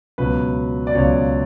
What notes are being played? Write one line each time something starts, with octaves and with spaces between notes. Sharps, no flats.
C#2 B2 F#3 C#4 F4 B4
D5
C#2 B2 F#3 C#4 F4 C#5